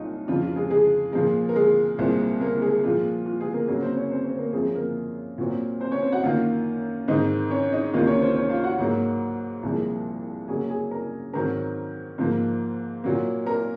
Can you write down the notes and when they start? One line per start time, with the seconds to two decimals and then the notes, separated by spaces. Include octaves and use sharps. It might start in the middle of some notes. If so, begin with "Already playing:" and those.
Already playing: C2 A#2 F#3 D#4 F4 F#4
0.28 F2 C#3 F3 F4
0.42 F4
0.56 G#3 G#4
0.70 G#3 G#4
1.13 A#2 F3 G#3
1.49 A#4
1.56 G#3 G#4
1.99 C2 A#2 G#3 C4
2.41 A#3 A#4
2.62 G#3 G#4
2.83 A#2 F3 G#3 F4
3.26 F4
3.40 G#3 G#4
3.54 A#3 A#4
3.68 F#2 C#3 F#3 A#3 A#4
3.82 C4 C5
3.96 C#4 C#5
4.10 C4 C5
4.25 C4 C5
4.39 A#3 A#4
4.53 F#2 F3 G#3 C4 G#4
4.75 A#3 A#4
5.38 A#2 F#3 C4
5.80 C4 C5
5.92 C#4 C#5
6.02 C4 C5
6.12 F#4 F#5
6.23 F#2 D#3 A#3 F4 F5
7.08 G#2 D#3 G#3 C4 D#4 D#5
7.51 C#4 C#5
7.72 D#4 D#5
7.93 C#2 C3 D#3 A#3 F4 F5
8.07 C#4 C#5
8.22 C4 C5
8.36 C#4 C#5
8.50 F4 F5
8.64 F#4 F#5
8.78 G#2 F#3 A#3
9.63 C2 A#2 F3 G#3
10.48 F#2 C#3 F#3 A#3 G#4 G#5
10.70 G#4 G#5
10.91 A#4 A#5
11.33 G#2 D#3 F#3 C4 A#4 A#5
12.18 G#2 F3 A#3
13.04 A#2 F#3 A#3
13.46 A#4 A#5